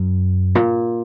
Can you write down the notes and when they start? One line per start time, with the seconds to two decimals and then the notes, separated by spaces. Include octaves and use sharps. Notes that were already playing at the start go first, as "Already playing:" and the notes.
Already playing: F#2
0.55 A#2